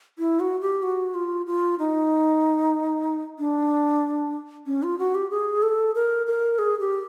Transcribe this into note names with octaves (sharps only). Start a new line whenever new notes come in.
E4
F#4
G4
F#4
F4
F4
D#4
D4
C#4
F4
F#4
G4
G#4
A4
A#4
A#4
G#4
G4